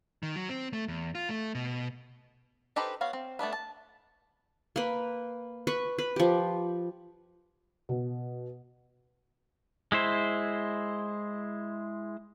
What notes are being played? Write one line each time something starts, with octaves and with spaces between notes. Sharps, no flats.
D#3
F#3
C4
A3
E2
F4
A3
B2
D#4 G4 A4 B4 C5
B3 F#4 C#5 F5
C4
A3 B3 D4 B4
A5
A#3 B4
B4 C#6
B4
F3 G4
B2
G#3 E4 C5